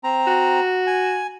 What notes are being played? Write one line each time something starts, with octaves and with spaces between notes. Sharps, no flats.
C4 A#5
F#4
G#5